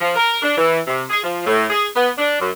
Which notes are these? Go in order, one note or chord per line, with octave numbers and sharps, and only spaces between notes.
F3
A#4
D4
E3
C3
G#4
F3
A2
G#4
B3
D4
F#2